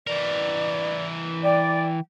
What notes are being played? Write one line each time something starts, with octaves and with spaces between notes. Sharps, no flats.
E3 A#4 D5
D5 G5